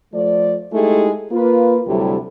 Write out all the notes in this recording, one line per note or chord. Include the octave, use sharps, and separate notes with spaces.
F3 A3 D5
G#3 A3 D#4 E4 G4 G#4
A#3 F4 B4
D2 C3 F#3 G3 A3 E4